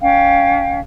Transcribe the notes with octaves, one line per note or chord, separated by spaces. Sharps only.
C#4 F5 G5